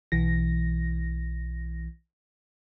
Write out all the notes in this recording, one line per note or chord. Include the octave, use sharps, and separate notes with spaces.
B1 E3 A#6